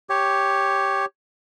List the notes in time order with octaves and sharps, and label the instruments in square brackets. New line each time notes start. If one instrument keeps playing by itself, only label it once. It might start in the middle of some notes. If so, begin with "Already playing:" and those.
[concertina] G4 C#5